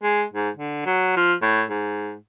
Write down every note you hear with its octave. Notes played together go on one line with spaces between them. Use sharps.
G#3
G#2
D3
F#3
F3
A2
G#2